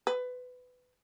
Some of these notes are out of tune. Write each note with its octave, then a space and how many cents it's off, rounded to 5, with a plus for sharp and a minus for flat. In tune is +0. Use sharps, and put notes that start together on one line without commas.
B4 +20